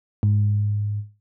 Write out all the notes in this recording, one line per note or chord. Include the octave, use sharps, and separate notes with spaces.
G#2